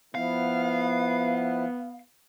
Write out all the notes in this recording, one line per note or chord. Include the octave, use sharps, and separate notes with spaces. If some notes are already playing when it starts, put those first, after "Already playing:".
F3 B3 E4 F5